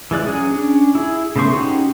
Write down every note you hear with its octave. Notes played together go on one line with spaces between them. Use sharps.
E3 G#3 D5 F#6
F#3 C#4 G#4
C#4 D4
E4 G#4
C#3 A3 B3 C5 C#6
C#4 D#4 F#4 G4